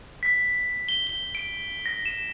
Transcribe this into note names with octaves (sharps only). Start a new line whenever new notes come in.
B6
G7
G7
D7
A#6
E7